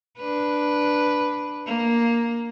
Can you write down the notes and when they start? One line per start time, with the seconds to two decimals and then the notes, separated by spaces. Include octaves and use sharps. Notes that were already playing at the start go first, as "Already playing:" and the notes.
0.18 D4 B4
1.67 A#3